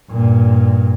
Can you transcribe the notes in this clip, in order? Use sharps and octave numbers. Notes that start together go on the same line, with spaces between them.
G2 A#2